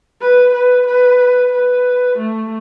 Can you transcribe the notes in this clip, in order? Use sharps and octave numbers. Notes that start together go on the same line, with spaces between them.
B4
B4
B4
B4
A3